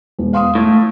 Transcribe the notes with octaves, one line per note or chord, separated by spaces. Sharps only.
E1
F5 C6 D#6
A2